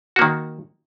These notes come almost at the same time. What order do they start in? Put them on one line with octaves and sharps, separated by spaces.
F#4 A#3 D#3